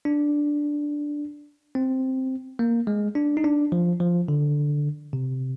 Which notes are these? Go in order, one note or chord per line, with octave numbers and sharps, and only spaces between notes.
D4
C4
A#3
G#3
D4
D#4
D4
F3
F3
D3
C3